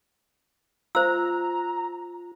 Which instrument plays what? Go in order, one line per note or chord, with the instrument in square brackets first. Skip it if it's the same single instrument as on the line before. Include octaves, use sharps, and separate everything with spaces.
[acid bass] F4 [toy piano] C5 E6 [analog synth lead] A#5